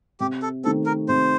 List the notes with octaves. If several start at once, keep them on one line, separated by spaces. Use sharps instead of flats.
C3 G4
A4
D#3 A3 C4 A4
A#4
C3 C5